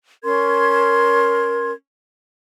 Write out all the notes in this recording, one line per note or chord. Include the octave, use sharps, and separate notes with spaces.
C#4 A#4 C6 G#6